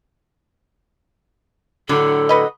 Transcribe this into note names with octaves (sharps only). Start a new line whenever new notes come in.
A2 D3 F#3 A4
F#4 B4 D#5